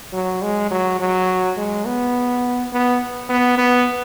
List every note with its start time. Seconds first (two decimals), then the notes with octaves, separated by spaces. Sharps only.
0.13 F#3
0.42 G#3
0.71 F#3
0.99 F#3
1.57 G#3
1.86 B3
2.73 B3
3.29 B3
3.58 B3